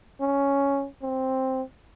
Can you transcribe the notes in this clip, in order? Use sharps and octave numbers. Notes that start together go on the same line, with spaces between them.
C#4
C4